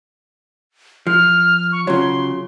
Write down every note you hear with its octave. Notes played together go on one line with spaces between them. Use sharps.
F3 F6
C#6
C#3 F#3 F4 C#5 C6